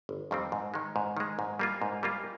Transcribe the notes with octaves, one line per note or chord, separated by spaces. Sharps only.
G1
F2 D#3 G3 C4
G#2
D#3 G#3
G#2
D#3 G#3
G#2
G3 A#3 F4
G#2
G3 A#3 F4